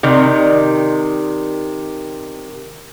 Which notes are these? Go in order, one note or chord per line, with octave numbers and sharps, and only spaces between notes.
C3 D#3 D5